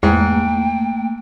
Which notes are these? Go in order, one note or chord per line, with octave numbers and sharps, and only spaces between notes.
E2 G#2 A3 A#3 G5